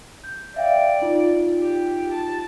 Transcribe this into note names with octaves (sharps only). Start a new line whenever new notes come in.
G6
D5 E5 F5 G5
D#4 F4
G4
A5